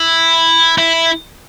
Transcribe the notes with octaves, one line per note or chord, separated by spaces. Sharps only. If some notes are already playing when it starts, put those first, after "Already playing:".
Already playing: E4
E4